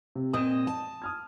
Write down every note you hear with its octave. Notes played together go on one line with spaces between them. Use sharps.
C3
A#2 C4 D#5 D#6 E7
A5
D#6 F6 G#6